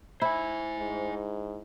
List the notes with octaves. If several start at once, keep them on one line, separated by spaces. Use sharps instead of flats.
E4 C5 G#5
G#2